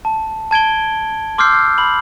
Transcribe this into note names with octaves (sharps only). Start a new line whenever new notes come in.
A5
A5 G#6 D7 G7
C6 D6 E6 F6 G6 C7
B5 F#7